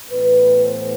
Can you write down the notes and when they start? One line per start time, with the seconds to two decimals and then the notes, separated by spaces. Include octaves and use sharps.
0.11 A2 E3 B3 B4
0.63 C5